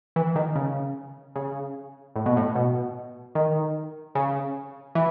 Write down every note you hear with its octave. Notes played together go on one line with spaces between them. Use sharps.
E3
D#3
C#3
C#3
A2
B2
A2
B2
D#3
C#3
E3